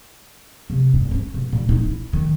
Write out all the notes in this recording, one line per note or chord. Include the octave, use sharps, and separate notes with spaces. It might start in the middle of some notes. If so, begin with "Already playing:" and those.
C3
G2
C#4
B2
A#2
D#4
E4
D#3